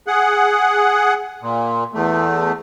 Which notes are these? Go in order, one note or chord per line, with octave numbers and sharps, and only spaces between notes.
G#4 F#5
A#2
E2 A3